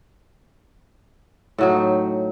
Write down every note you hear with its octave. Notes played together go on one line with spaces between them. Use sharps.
A2 F#3 D#4